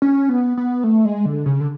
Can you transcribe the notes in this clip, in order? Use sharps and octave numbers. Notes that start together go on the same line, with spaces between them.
C#4
B3
B3
A3
G#3
D3
C#3
D3